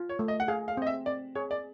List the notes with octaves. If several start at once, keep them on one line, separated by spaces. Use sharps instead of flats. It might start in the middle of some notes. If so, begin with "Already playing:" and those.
Already playing: F4
C#5
A3
D#5
F#5
G#4 F5
F5
C4 D#5
E5
C4 D5
G#4 C#5
D5